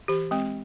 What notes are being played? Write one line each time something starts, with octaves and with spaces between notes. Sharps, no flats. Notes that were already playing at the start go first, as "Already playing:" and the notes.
E3 G4
G#3 C4